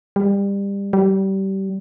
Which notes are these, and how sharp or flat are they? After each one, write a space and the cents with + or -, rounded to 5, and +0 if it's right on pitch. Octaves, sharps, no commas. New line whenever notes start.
G3 +25
G3 -25